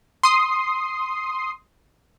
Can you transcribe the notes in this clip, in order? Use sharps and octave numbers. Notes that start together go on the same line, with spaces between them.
C6 D#6 C7